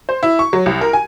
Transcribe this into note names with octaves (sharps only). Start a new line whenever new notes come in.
C5
E4
C#6
F#3
C2
A#4
G#5